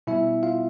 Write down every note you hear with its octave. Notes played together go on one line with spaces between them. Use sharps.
B2 G3 B3 E4 E5
F4 F5